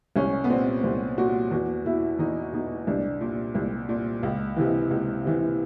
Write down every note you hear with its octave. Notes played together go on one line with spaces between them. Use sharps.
C2 C#4
B3
A#2 C4
C2 C4
A#2 F#4
E2 F#4
B2 E4
E2 D#4
B2 D#4
C2 D4
A#2
C2
A#2
C#2
C3 E3
C#2
C3 E3